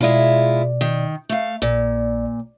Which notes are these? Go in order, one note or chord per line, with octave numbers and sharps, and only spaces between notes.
B2 G#3 E4 F4 D5
D#3
A3 F5
A#1 A#2 D5